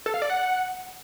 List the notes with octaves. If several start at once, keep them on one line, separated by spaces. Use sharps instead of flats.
A4
F5
D5
F#5